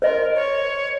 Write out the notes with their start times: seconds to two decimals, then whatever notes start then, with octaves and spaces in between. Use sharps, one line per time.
0.02 A#4 C5 D#5 C6
0.35 C#5